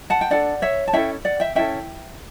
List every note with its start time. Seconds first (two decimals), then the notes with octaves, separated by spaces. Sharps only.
0.10 F#5 A5
0.21 G5
0.31 D4 A4 D5 F#5
0.62 C#5 E5
0.88 A5
0.93 C#4 E4 A4 E5 G5
1.25 D5 F#5
1.40 E5 G5
1.55 C#4 E4 A4 E5 G5